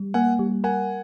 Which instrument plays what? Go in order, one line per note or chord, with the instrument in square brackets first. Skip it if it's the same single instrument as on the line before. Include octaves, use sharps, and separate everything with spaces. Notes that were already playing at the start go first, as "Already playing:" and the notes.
Already playing: [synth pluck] G3
[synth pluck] A#3 [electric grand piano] F#5 G#5
[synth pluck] G3
[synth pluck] A#4 [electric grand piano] F#5 G#5